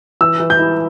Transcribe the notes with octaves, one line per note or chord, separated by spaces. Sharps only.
E3 E6
E3
G6
E4